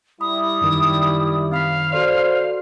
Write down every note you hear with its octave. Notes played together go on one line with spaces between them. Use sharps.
G3 E4 B5 D#6
F#2 D#3
C4 F5 B5 B6
F#4 A4 C5 D5